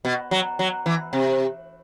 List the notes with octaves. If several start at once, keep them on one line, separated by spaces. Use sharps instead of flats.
B2
F#3
F#3
E3
C3